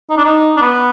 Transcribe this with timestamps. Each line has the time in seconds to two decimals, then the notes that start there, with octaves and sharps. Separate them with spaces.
0.10 D#4
0.17 D4
0.25 D#4
0.57 D4
0.61 B3